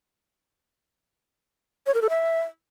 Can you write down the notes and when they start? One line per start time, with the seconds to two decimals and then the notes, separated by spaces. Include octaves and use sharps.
1.87 C#5
1.94 A#4
2.02 A4
2.10 E5